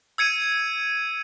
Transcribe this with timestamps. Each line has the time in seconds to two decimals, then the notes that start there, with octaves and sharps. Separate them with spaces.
0.18 E6 G#6 C#7 D#7